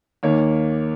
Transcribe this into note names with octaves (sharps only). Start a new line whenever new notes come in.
D#2 D#3 A#3 C#5